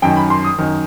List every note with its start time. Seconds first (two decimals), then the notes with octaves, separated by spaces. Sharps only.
0.02 F#2 D#3 G5
0.16 B5
0.30 C6
0.45 D#6
0.58 F#2 D#3